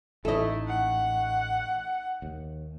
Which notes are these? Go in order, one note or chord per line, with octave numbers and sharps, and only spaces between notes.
A1 A3 D#4 E4 A4 D#5
F#5
D#2